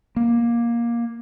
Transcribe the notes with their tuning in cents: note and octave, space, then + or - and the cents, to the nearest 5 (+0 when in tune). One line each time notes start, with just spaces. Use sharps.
A#3 +15